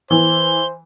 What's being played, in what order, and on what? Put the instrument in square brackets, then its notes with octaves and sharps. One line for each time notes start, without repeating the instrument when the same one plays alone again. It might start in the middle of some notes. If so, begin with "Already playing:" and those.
[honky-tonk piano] E3 [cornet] C5 [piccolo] G7